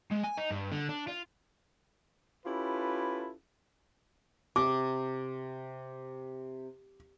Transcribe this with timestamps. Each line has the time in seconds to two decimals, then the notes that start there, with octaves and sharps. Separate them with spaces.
0.11 G#3
0.23 G#5
0.37 D#4
0.51 G2
0.72 D3
0.89 D4
1.07 F4
2.45 C#4 E4 F4 G4 A4 B4
4.56 C3 D6